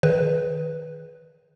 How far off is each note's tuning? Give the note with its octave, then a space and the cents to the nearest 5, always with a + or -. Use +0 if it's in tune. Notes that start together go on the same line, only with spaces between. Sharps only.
D#3 +0 G#4 +15 B4 -5